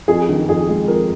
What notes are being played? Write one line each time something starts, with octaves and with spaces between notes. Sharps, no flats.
F2 G#4
D#3
F2 G#4
G#3
F2 A#4